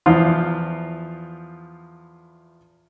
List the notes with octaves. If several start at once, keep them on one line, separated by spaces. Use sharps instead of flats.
E2 F3 E4 F4